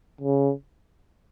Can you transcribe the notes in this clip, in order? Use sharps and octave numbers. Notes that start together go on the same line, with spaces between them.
C#3